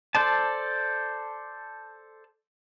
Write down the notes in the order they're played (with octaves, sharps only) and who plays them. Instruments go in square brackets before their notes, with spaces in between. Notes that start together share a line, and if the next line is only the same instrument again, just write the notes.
[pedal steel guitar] A4 C5 D5 A5